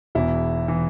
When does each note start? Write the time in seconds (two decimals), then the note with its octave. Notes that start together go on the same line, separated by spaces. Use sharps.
0.15 E1 E2 E3 E4
0.68 E3